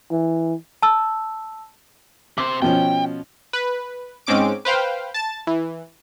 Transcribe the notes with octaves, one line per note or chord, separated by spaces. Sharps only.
E3
A5 E6
C3 C5 D6
B2 F3 C#4 G5
B4
G#2 G#3 C4 C#4 D6 D7
B4 C5 F5 G5
A5 A6
E3